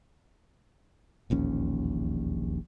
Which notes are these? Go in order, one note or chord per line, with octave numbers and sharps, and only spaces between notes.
E1 A#1 D#2 C#4